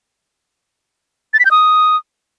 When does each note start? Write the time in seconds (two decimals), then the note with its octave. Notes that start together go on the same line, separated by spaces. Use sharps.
1.34 A6
1.39 B6
1.45 G6
1.51 D#6